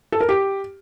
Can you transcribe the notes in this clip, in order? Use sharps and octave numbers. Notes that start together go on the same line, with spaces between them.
A4
A#4
G4